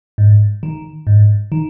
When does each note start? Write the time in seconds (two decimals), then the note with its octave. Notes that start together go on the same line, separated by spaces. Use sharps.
0.18 G#2
0.63 D#3
1.07 G#2
1.52 D#3